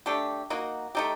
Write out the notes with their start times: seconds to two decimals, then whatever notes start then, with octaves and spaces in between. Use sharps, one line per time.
0.06 A3 D4 G4
0.50 A#3 D#4 F#4
0.95 A3 D#4 G4